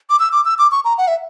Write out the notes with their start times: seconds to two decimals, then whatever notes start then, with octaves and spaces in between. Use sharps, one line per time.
0.10 D6
0.20 E6
0.32 D6
0.45 E6
0.59 D6
0.72 C#6
0.85 A#5
0.98 F#5
1.08 E5